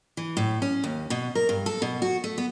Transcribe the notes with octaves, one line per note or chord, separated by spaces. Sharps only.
E3
A2
C#4
D#2
B2
A#4
G2
A4
B2
F#4
A3
B3